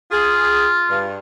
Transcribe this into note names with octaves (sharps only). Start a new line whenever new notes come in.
F4 G#4
G2